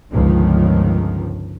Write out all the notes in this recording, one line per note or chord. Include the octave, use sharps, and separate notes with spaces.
G1 C#2 D#3 F3